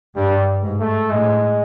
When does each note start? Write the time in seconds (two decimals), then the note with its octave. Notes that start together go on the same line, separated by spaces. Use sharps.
0.16 G2 G3
0.63 G#2
0.80 A3
1.10 A2 G#3